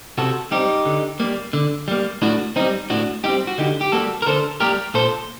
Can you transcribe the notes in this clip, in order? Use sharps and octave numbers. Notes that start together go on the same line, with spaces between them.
C3 F#4 A4
G3 C4 D#4 G4
D3
G3 A#3
D3
G3 A#3
A2 D4 F#4
G3 C4 D#4
A2 D4 F#4
G3 C4 D#4 G4
F#4
D3 D#4 G4
G4
G3 A#3 F#4 A4
A#4
D3 A4 C5
G3 A#3 G4 A#4
A#2 A4 C5